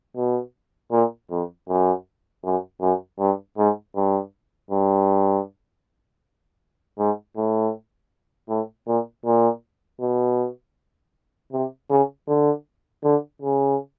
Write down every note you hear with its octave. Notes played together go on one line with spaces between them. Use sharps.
B2
A#2
F2
F#2
F#2
F#2
G2
G#2
G2
G2
G#2
A2
A2
A#2
A#2
B2
C3
C#3
D3
D3
C#3